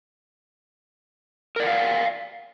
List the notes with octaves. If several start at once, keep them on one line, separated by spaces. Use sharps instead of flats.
A#4 D5 F5 F#5